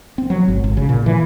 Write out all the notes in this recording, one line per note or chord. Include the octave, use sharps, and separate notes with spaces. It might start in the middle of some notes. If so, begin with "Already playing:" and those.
C4
F#3
G#1
G#1
C#3
A#2
E3